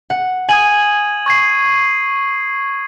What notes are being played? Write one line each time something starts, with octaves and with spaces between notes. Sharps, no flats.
F#5
G#5 D#6 G#6 D#7 F#7
C#6 G#6 C7